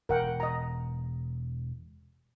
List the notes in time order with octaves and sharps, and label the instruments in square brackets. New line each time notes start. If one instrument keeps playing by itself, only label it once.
[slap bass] E1 [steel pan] A#4 F#5 G5
[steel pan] D#5 A#5